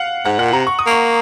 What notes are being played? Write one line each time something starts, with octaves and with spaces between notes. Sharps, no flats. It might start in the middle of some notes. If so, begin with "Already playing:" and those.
Already playing: F5 F#5
G#2 F#5
A#2 F#5
C3 A#5
C#6
D#6
A#3 C#6